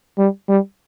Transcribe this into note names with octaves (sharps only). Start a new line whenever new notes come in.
G3
G3